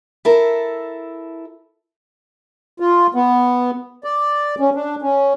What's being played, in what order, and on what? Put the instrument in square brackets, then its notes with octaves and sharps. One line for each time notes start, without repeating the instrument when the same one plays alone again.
[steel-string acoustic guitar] E4 A4 A#4
[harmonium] F4
B3
D5
C#4
D4
C#4